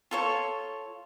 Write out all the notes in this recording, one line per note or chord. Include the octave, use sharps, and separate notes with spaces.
F4 A4 C#5